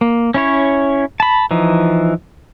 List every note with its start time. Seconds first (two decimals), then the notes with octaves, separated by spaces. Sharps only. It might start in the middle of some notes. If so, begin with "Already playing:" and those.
0.01 A#3
0.34 C#4 E4 C#5
1.20 A5 B5
1.51 E3 F3 D#4